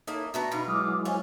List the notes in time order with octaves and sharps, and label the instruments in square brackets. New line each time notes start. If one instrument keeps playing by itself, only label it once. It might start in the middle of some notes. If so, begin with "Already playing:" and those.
[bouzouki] A#3 E4 D#5 [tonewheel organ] D#4 A4 C#5
[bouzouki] A3 B3 A#5 [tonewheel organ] D4 [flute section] F#4
[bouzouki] B2 F4 [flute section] D#4 B5
[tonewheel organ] F#3 G#3 E4 [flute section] D6 D#6 F6
[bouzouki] C#4 F4 [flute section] C5 D#5 G#5